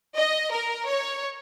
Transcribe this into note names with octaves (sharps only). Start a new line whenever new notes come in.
D#5
A#4
C#5